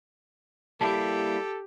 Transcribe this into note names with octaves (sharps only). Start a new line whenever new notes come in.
G3 A#3 E4 G4 A4 A5